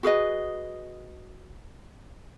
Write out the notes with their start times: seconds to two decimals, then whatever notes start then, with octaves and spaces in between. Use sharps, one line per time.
0.03 F#4 G#4 B4 D#5